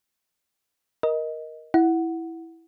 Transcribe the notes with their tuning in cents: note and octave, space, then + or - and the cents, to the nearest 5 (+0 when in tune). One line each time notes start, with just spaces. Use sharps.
A#4 +15 D#5 +10
E4 +0 F#5 +0